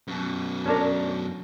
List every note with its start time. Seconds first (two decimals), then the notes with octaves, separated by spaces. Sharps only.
0.08 F#2 B2
0.66 C#4 D4 A#4